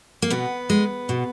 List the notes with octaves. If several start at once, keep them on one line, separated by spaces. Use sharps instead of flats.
A#3
B2 B3
G#3
B2